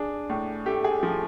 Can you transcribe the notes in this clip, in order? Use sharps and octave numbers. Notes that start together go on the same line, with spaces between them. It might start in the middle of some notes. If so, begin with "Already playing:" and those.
Already playing: D4 G#4
A2
A3 G4
G#4
F3